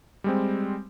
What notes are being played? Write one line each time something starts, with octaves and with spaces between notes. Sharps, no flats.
G3 G#3 C4